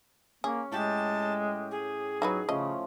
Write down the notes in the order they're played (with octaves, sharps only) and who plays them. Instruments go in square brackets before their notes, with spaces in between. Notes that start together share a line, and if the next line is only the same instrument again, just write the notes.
[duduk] A#3 [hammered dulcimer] C#4 [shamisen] G#4
[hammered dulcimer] A2 G4 [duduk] G#3 [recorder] A5
[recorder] G#4
[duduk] F#3 [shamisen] D#4 F#4 B4
[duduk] C#3 [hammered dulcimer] F3 A3 C#4 [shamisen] D#5